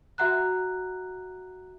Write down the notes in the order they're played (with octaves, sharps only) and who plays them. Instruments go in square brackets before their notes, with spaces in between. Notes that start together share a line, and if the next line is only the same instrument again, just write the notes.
[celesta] F#4 E5 F#5 A#5 F#6